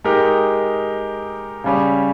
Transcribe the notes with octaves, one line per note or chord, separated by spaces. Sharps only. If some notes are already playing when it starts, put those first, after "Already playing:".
G#3 D#4 G4 A#4
C#3 G3 C#4